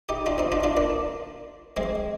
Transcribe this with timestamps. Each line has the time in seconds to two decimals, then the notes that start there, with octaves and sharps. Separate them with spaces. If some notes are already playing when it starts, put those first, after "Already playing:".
0.09 D#4 G4
0.26 D4 F4
0.38 C4 D#4
0.52 D4 F4
0.64 D4 F4
0.77 A#3 D4
1.77 G#3 C4